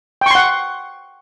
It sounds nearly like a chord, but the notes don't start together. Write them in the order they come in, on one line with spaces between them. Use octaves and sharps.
G5 C#6 C6 F#5